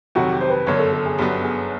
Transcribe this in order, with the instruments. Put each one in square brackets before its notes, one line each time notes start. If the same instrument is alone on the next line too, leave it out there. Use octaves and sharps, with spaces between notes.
[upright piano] F2 C3 D#3 F#3 [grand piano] F#4
[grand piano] G4
C5
B4
[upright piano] G1 F#2 D3 [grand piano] C#5
[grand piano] A#4
A4
A4
G#4
[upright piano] G1 F#2 D3 F#3 B3 [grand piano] G4
[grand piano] G#4